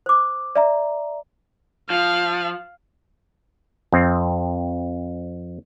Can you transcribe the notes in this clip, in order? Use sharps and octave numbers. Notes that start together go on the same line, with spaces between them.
C5 D6
D5 E5 A#5
F3 F5
F2 C4